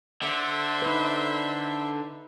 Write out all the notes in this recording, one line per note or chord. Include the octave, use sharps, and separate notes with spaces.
D3 C5 E5
D#4 B4